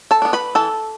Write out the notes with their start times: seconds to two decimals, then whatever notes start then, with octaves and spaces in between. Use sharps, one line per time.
0.11 A4 A5
0.22 B3 D4
0.33 B4 B5
0.55 E3 A4 A5